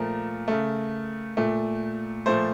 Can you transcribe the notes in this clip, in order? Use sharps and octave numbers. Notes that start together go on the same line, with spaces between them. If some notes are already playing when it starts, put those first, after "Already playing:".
Already playing: A#2 F3 A3 A#4
C#3 A3
A#2 A3
A#2 F3 A3 C5